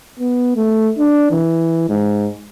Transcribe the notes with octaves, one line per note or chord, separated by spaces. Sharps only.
B3
A3
D4
E3
G#2